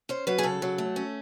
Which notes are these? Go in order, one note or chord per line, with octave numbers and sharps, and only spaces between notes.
C#4 C5
F#3 B4
G#4
C#3 A4
F#3
A3
C#4